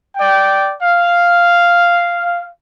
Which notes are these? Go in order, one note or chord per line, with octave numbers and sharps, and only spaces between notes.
D5 G5
F5